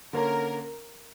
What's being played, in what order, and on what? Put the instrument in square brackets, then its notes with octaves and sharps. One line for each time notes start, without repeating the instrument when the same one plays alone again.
[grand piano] D3 A#3 C#4 [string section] A#4